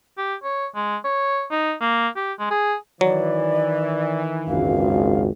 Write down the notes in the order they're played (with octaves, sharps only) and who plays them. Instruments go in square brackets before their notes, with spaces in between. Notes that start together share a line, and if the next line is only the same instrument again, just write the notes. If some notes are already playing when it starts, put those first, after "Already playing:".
[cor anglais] G4
C#5
G#3
C#5
D#4
A#3
G4
G#3
G#4
[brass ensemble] D#3 E3 [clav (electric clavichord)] F#3 [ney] D5
[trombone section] G#1 C#2 F#2 [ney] F5